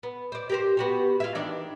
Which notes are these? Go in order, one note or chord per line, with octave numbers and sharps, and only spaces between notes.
B3
C5 D5
G4 A#4 C5
B3 F#4 G4
F4 G#4 E5
D#3 E3 D4